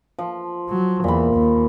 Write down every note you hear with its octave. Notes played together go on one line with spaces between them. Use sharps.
F3
F#3
E2 A#2 B5
D#2